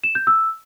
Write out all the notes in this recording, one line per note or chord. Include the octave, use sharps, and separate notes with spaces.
E7
G6
E6